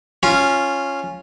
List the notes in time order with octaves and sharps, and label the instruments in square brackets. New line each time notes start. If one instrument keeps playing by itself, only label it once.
[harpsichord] C#4 F4